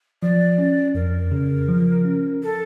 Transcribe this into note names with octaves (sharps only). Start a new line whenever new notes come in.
F3 D5
C#4
F2 A#4
C#3
F3
C#4
A4